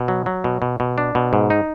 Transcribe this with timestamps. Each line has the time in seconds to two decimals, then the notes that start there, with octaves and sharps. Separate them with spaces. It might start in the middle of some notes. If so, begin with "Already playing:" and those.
Already playing: B2
0.08 F#3
0.26 F#3
0.44 B2
0.62 B2
0.80 B2
0.98 D4
1.15 B2
1.33 G#2
1.50 D#4